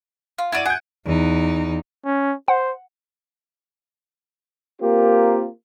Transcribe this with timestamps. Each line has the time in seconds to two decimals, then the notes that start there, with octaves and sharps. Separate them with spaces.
0.38 F4
0.52 E4 F#4 D5 G#6 D7 D#7
0.66 G#4 F#5 G6
1.06 E2 D#4
2.05 C#4
2.48 C5 F#5
4.80 A#3 C4 F4 G4 A#4